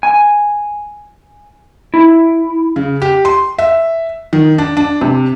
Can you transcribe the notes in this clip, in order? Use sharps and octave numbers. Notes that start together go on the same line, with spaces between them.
G#5
E4
C#3
G4
C6
E5
D#3
D4
D4
C3